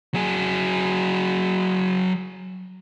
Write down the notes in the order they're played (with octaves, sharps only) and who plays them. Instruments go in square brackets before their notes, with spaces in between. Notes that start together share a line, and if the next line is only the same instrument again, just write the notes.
[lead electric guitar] F#3 G#4